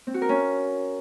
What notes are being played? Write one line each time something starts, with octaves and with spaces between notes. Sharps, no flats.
C4
F#4
A#4
C#4